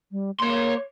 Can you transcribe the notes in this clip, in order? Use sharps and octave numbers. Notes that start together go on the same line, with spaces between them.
G3
A#3 C#5 C6